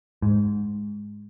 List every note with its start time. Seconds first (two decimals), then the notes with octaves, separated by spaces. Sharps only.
0.22 G#2